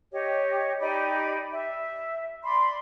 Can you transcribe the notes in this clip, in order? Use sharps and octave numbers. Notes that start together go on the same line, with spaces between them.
G4 C#5 D#5
D#4 G4 D5 B5
E5
D5 B5 C6